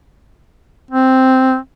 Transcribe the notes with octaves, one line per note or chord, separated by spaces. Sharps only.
C4